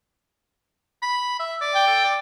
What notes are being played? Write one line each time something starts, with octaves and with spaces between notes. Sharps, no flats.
B5
E5
D5
G5
A4
D5